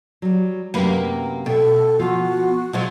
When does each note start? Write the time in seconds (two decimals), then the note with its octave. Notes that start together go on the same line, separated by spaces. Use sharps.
0.22 F#3 G3
0.74 F#2 C3 A#3 G4 B4
1.46 B2 A4 E5 G5
1.99 F3 B3 F4 F#4
2.73 B2 F3 F#3 G#3